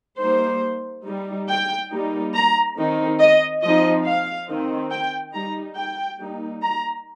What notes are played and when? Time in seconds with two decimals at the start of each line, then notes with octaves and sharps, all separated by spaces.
0.19 G3 A#3 D#4 C5
1.05 G3 D#4
1.49 G5
1.91 G3 A#3 D#4
2.34 A#5
2.77 D#3 C4 D#4
3.20 D#5
3.62 F3 C4 D#4 D#5
4.05 F5
4.48 D#3 C4 D#4
4.91 G5
5.33 G3 D#4 A#5
5.76 G5
6.19 G3 A#3 D#4
6.62 A#5